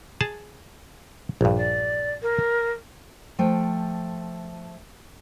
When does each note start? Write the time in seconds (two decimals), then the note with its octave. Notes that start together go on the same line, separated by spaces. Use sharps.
0.21 G#4 A5
1.41 A#1 G2
1.56 D5
2.22 A#4
3.39 F3 A3 G5